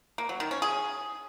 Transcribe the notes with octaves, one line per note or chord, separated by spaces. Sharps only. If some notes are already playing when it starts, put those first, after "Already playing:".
A#3
F#3
D#3
C#4
G#4